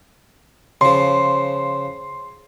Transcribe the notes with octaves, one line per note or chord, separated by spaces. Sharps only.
C#3 F3 C6